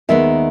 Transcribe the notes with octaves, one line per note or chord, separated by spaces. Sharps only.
D#2 D#3 G#3 B3 E5